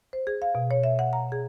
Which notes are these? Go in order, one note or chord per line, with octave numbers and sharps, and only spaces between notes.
C5
G#4
F5
B2
C#5
E5
F#5
A#5
G#4